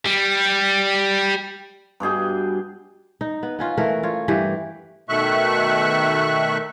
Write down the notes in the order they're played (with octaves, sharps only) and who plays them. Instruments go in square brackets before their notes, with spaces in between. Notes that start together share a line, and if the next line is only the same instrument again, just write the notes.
[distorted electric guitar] G3
[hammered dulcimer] G2 B2 G#4 G5
[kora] D#4
B3
B3 C#4 F4
E3 A3 A#4
F4 C#5
G2 E3 G4
[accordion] B2 D#3 A3 E5 C#6 F#6